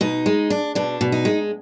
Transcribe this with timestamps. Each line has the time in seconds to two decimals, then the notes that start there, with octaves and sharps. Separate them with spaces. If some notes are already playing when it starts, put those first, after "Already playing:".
0.01 B2 D#4
0.26 G#3
0.50 D4
0.75 B2 D4
1.01 B2
1.12 D#4
1.25 G#3